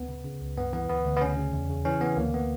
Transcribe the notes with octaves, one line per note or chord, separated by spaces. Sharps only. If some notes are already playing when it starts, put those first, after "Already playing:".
Already playing: D2 B3
C#3
C#3
C#2
G2 B3
E3 B3
D2 B3
D2
B3
C#3 C#4
C#3
E2
C#3
E3 C#4
E3 B3
D2 A#3
B3